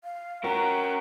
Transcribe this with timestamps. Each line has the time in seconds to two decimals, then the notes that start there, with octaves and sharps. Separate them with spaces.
0.04 F5
0.44 C#4 F#4 A#4 G5 A#5